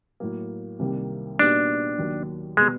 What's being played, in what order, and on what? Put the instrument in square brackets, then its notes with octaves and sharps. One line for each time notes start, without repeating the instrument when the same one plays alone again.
[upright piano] A2 F#3 A#3
C2 C3 D#3 G3 A#3
[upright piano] A#2 G3 B3 D#4 F#4 [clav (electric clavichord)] D4
[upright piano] D#2 D#3 F#3
[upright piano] B2 G3 B3 [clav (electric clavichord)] G#3